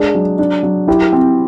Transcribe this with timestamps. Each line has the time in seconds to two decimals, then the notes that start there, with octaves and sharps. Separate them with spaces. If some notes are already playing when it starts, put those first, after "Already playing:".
Already playing: G#3 D4 G#4
0.15 F#3
0.39 D4
0.63 F#3
0.88 E4 G4
1.13 C4